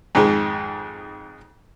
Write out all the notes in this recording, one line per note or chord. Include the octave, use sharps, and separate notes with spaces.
F2 G#2 D#3 G#3